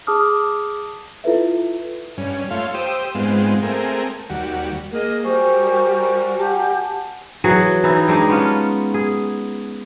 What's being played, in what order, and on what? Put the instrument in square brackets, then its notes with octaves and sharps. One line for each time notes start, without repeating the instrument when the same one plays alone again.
[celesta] G#4 A5 D6 D#6 F6
E4 F4 A4 B4 E5
[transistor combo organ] G2 C#4
A3 F4 C#5 F5 C6
G4 C5 D#6 E6
G#2 G#3 B3 C4 F4
A3 C4 G#4 A#4
D#2 G3 F#4
[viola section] A#3 G#4 D#5 [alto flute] A#4
[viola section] G3 F#4 A#4 [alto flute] G4 [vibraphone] C5 G#5 C#6
[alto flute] G4 [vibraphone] F#5 G#5 A5
[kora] E3 F#3 F#4 G#4
E3 D#4 E4
G3 G#3 D4 D#4
B3 C#4 F4
G#4